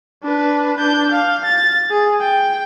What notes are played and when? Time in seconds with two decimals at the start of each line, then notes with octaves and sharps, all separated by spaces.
0.23 D4 B4
0.77 D4 G6
1.11 F5
1.45 A6
1.90 G#4
2.21 G5